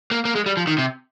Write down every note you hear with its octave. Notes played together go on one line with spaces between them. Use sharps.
A#3
A#3
G#3
G3
F3
D#3
C3